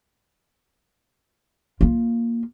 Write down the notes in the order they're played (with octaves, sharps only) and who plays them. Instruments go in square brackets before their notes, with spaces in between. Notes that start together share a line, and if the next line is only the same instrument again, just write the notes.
[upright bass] A#3 F4